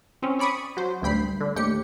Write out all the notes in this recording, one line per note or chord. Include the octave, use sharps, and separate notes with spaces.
C4 C#4
C#5 D5 B5 C#6 D#6
F#3 C5
A1 D2 G2 G5 B5 C7
D3
D#2 A2 G4 C#7